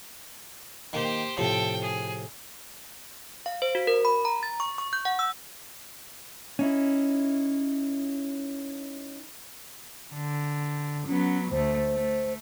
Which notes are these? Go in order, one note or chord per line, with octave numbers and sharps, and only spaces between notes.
D#3 A#3 G4 C5
A2 C3 F3 A4 G5
G#4
F5
C5
F#4
A#4
B5
A#5
A6
C#6
C#6
G6
F#5
E6
C#4 D#4 E4
D3
F#3 B3 C#4
D2 A3 C5
A3